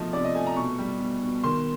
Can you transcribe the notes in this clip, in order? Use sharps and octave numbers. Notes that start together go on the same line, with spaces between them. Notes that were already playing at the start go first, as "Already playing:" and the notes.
Already playing: B2 F3 A3 D#5
C3 D5
D#5
A3 G#5
A#5
B2 C#6
G3
B2
B2
D#3 C6